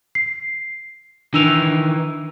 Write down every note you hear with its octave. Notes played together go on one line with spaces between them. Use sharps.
C7
D#3 E3 D4 E6 F7